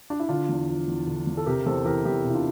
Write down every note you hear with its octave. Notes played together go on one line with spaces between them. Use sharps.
D4
E4
D3 D4 F4
E2
F3
E2
D3
E2
A4
C3 G4 A#4
E2 A4 C5
E3 G4 A#4
E2 E4 G4
C3 E4
D4 F4